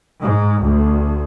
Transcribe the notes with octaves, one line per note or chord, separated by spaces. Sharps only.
G#2
D2